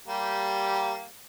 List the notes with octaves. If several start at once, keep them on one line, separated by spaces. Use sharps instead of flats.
G3 A#3 G4